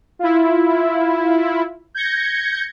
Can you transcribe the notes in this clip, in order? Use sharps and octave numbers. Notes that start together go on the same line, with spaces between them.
E4 F4
G6 G#6 A#6 C#7